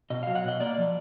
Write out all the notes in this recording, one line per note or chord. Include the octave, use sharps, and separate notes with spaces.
B2 D#5
F#3 F5
F#5
B2 D#5
A#3 D5
F3